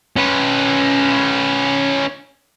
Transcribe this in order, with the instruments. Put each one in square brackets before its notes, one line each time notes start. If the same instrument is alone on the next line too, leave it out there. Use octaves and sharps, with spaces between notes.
[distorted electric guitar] C#4 B4